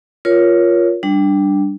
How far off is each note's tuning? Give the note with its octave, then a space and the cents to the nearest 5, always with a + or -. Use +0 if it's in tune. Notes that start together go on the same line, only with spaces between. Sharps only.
F4 +0 A#4 +20 C#5 +5
G3 +0 D4 +0